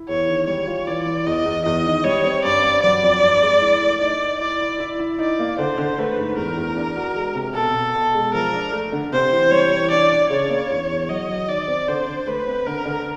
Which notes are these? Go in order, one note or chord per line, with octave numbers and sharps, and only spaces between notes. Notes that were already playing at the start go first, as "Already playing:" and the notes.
Already playing: E4
E2 C#5
D#3
G3 C#5
F4
E3 D5
E3
E2 D#5
E2
E2 D#5
D#3
G3 C#5
C4
G2 D5
G2
F#3 D5
F2
G2
G#3
E4
A3
D#4 D5
D#4
E4 D5
E4
E4
E4
D#4 D5
A#3
D3 C5
D3
A3 B4
G#2
E2 A#4
E2
D4
F#4
G#3
C3
B2 A4
B2
B2
G#3
F3 A#4
D4
A3
D3
C3 C5
E3
G3 C#5
E3
D4 D5
D4
C#3 C#5
A#3
E2
E2
F#3 D#5
F#3
D#3 D5
C4
D3 C5
D3
A3 B4
C4
D3 A#4
D3